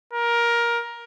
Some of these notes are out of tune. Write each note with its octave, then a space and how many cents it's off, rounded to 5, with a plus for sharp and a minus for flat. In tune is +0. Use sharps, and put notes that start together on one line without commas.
A#4 +15